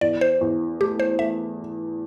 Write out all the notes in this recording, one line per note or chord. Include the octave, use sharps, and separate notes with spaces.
E2 D5
C5
E2
A3 G4
C5
A3 E5